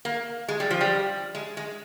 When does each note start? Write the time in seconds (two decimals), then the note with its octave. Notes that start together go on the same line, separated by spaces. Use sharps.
0.05 A#3
0.48 G#3
0.60 G3
0.71 F3
0.81 G3
1.35 G#3
1.57 G#3